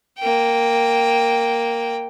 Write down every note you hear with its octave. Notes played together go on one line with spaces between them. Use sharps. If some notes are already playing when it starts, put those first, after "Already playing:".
A#3 G5